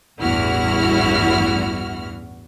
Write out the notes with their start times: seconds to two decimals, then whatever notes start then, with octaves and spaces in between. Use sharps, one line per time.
0.19 A1 E2 G2 E4 F#4 F6